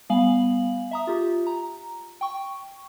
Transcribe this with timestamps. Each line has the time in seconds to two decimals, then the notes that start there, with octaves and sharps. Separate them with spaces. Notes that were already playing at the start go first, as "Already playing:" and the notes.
0.10 G3 B3 F5 G#5 F#7
0.91 E5 A#5 D#6
1.07 F4 G4
1.47 A#5
2.21 G5 C#6